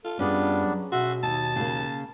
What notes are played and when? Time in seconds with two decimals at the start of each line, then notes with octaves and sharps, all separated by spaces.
0.05 F4 A4
0.19 F#2 G3 B3 C#4 D4 G#4
0.65 F#3
0.92 B2 F#4 E5 C6
1.23 D#2 D#4 A5
1.56 C#3 A#3